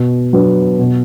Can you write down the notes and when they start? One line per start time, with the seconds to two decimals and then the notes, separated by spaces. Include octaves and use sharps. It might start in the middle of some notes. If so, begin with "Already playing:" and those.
Already playing: B2
0.33 F#3 B3 D4
0.79 B2